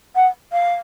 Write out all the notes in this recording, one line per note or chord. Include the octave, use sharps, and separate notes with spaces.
F#5
F5